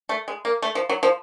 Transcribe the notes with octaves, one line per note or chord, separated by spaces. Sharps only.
A3
G#3
A#3
A3
F3
F#3
F3